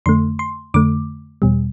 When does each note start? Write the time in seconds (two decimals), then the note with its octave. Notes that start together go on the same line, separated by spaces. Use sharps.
0.06 F2 D3 A3 C6
0.39 C6
0.74 F2 D3 A3 D6
1.42 E2 B2 G3